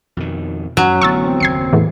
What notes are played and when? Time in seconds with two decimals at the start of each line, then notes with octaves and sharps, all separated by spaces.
0.17 F2 B2 D#3
0.77 F#2 F#3 C#4
1.01 A1 D3 B3 C#6 E6 A6
1.26 C4
1.40 F#1 D#2 G#6 C7 C#7
1.73 E2 A2 E3